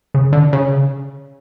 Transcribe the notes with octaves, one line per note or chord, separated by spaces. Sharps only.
C#3
D3
C#3